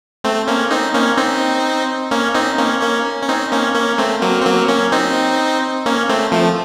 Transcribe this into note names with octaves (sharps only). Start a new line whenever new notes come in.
A3 C4
A#3 C#4
C4 D#4
A#3 C#4
C4 D#4
A#3 C#4
C4 D#4
A#3 C#4
A#3 C#4
C#4
C4 D#4
A#3 C#4
A#3 C#4
A3 C4
F#3 A#3
C4
F#3 A#3
A#3 C#4
C4 D#4
A#3 C#4
A3 C4
F3 A3